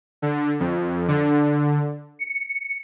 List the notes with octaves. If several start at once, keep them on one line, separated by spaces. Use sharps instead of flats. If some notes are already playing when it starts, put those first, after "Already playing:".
D3
F2
D3
C#7